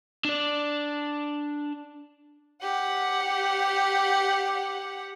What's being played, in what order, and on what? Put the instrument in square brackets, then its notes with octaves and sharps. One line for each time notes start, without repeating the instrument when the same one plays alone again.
[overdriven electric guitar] D4 D5
[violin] G4 F#5